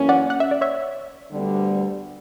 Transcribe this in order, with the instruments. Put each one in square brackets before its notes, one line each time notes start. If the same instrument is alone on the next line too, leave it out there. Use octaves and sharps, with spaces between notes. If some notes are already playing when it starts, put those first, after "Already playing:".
Already playing: [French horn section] F#2 E3 A#3 C#4
[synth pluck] D5 F#5
F#5
E5
D5
C#5 E5
[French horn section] D2 D3 G3 B3